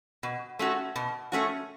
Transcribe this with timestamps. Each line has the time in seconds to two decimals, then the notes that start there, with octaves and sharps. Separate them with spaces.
0.23 B2
0.59 A3 C#4 F#4
0.96 B2
1.32 A3 C#4 F#4